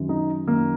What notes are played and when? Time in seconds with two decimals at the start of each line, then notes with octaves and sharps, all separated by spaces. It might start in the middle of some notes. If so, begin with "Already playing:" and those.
Already playing: F#2 D#3
0.09 D#4
0.47 F#2 D#3 A#3